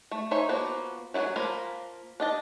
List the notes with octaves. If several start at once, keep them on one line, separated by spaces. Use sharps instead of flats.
A3
D#4 C5 C#5 E5 G#5
F3 A#3 B3 F#4
F#3 E4 G#4 F#5 G#5
F3 A#3 F4 A#4 B5
D4 D#5 A5